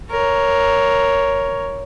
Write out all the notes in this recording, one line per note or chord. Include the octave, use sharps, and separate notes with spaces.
A#4 C#5